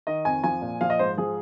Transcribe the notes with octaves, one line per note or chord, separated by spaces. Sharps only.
D#3 D#5
F2 G#5
F3 G#5
A#2
F3 F5
D#5
G#2 C5
F3 G#4